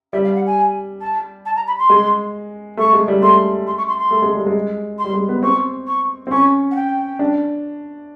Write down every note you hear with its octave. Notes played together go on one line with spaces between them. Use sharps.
G3 E5
F5
F#5
G#5
A5
A5
A#5
B5
C6
G#3
A3 C#6
G#3
G3
A3 C6
C6
C#6
C6
C6
A3
G#3
G3
G#3
C6
G3
G#3
B3
C4 C#6
C#6
C4
C#4 C#6
F#5
G5
D4